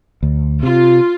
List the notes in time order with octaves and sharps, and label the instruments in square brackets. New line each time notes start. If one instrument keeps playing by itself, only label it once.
[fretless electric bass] D2
[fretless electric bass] C3 [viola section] F4